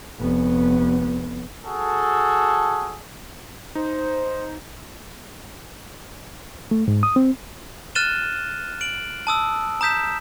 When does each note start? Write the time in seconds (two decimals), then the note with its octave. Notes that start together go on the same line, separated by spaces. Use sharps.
0.19 F1 B3
1.63 F#4 G#4 A4
3.75 D#4 C5
6.71 A3
6.88 G#2
7.03 D#6
7.16 C4
7.95 F6 F#6 A6 D#7 E7 G7
8.81 D7 F#7
9.27 A5 D#6 E6
9.81 A#5 D#6 G6 B6 E7